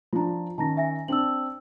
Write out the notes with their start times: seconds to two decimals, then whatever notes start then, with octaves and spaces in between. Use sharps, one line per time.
0.13 F3 D4 F4 A#5
0.58 D#3 C#4 A5 A#5 A#6
0.77 E5 G#5 A#6
1.08 C4 D4 E6 F#7